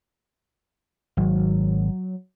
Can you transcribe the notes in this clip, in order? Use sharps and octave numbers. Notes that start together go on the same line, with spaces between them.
G#1 F#3